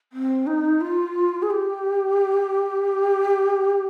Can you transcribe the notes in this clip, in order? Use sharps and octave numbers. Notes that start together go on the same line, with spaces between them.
C4
D#4
F4
G#4
G4